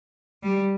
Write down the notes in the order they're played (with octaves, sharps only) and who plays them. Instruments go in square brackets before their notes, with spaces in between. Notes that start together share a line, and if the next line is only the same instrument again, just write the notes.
[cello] G3